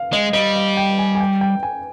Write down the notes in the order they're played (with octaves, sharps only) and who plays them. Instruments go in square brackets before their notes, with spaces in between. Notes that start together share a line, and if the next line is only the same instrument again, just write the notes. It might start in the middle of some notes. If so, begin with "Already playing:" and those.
Already playing: [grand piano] F5
[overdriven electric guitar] G#3 [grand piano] D#5
[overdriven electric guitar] G3 [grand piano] D#5
[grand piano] F5
G5
G#5
G#5
G5
G5
G#5